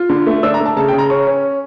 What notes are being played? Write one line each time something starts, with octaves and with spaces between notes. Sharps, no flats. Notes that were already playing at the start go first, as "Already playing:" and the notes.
Already playing: F4
D3
A3
D4 E6
A#5
A3
A5
C#3 A5
G5
C#3
A#5
C#4 C#6
C#4